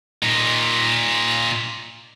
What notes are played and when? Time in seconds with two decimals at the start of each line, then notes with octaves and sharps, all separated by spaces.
0.23 A#2 D#4